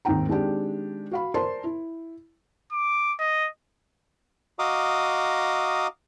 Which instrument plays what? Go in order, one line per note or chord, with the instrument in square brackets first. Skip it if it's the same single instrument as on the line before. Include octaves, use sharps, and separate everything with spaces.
[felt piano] D#2 G#2 C4 D#4 G5 A#5
D#3 G#3 C4 D4 G4
F#4 F5 B5
A#4 C5 D5 A5 C6
E4
[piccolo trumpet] D6
D#5
[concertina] F#4 D#5 F5 A#5 D6 D#6